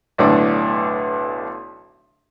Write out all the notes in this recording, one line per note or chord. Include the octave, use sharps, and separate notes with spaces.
B1 A2 D3 D4